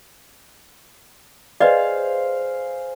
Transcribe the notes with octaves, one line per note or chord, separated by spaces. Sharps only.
G#4 B4 C5 D5 D#5 F5